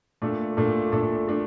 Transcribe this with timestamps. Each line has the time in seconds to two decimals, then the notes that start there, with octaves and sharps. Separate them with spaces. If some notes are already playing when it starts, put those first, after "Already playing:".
0.22 A#2 A3 D4 A4
0.57 A#2 A3 D4 A4
0.92 A#2 A3 D4 A4
1.28 A3 D4 A4